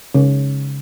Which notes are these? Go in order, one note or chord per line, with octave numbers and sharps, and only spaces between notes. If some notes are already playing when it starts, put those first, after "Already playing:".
C#3